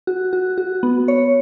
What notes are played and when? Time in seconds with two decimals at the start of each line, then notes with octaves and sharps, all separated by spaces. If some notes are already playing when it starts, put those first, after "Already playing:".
0.07 F#4
0.33 F#4
0.58 F#4
0.83 B3
1.08 C#5